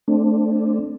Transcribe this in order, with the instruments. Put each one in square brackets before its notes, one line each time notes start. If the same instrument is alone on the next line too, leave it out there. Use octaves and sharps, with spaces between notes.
[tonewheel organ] A3 C4 D4